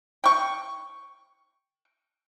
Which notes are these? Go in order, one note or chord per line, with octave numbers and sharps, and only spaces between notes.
G5 C#6